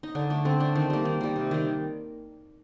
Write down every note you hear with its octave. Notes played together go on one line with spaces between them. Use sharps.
D#4
D3 D4
A3 D4
D3 C4
A3 D4
D#3 C4
G3 A#3
D#3
G3 A#3
C3
D#3 G3